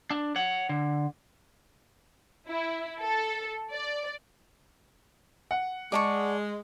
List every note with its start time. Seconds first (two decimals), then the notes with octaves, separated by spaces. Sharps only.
0.11 D4
0.36 C#5 F#5
0.69 D3
2.49 E4
3.01 A4
3.72 D5
5.51 F#5
5.92 G#3 D5 A5 C#6